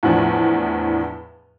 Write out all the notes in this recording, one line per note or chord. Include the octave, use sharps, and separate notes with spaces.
E2 A2 F3 D4